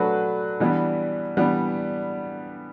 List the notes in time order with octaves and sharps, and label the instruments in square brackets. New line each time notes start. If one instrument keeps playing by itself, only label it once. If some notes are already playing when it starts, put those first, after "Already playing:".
Already playing: [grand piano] F#3 A3 D4 F#4 B4
E3 G3 B3 D4
E3 G3 B3 D4